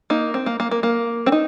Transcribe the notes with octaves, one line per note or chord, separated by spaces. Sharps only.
A#3 D#4
C4
A#3
A#3
A#3
A#3
C4
D#4